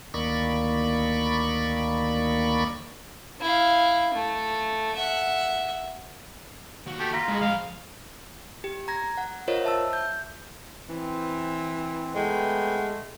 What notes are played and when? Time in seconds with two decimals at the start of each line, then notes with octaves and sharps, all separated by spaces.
0.14 D2 D#3 A#3 D5 B5 C#6
3.41 E4 F5
4.14 A3
4.96 E5 F#5
6.86 D#2 F#4
7.00 A3 G4
7.13 F4 A#5 A#6 B6
7.28 G#3 E4 F#4
7.41 F3 F5 B5
8.64 G4
8.88 A#5 G#6 A#6
9.17 F#5
9.48 F4 A#4 C5 C#5 D#5
9.64 E5 A5 E6
9.93 G6
10.89 E3 C4
12.15 G#3 A3 B3 G5